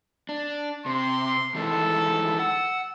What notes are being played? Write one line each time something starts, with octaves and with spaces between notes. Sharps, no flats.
D4
C3 C6
D#3 E3 G#3 A4
F#5 E6